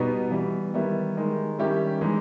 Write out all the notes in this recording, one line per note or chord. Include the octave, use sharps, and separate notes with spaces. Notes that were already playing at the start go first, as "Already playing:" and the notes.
Already playing: B2 G3 B3 D#4
E3 G3 B3
D#3 G3 B3 E4
D#3 G#3 D#4
D#3 G3 C#4 E4 G4
E3 G#3 D#4